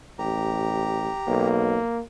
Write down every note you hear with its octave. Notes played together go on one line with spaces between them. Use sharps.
A1 G4 A#5
B1 A#3